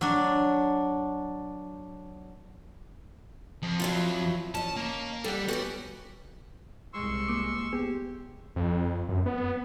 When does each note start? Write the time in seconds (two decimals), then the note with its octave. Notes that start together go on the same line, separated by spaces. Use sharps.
0.01 F#3 D4
3.63 F2
3.80 F#3 E4 F4
4.55 C#4 D#5 A5
4.76 A#3
5.24 G3 A4 F#5
5.48 B3 C#4 F#4 G4
6.93 C2 G#3 C6 C#6 E6
7.28 A#3 D6
7.73 B3 G4 G#4
8.56 F2
9.09 F#2
9.26 B3